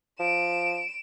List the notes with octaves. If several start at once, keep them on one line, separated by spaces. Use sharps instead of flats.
F3 D7 E7